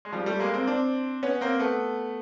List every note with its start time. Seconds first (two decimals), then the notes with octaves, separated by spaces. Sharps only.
0.05 G#3
0.12 F3 G3
0.26 G3 A3
0.40 G#3 A#3
0.54 A#3 C4
0.67 C4 D4
1.23 B3 C#4
1.41 A#3 C4
1.59 A3 B3